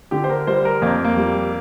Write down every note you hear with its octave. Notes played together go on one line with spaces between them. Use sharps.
D3 G4
C5
A#4
G3 C5
A#4
F2 A#3
A#3
G3